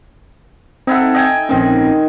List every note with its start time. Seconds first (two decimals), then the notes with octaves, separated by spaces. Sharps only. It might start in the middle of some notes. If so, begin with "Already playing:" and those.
0.87 C4 D#4 E4 A4 F#5
1.14 D#5 G5 G#5
1.49 A#1 D#3 G#3 C4 C#4